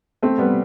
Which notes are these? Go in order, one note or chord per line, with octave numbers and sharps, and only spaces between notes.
A3 C4
G3 B3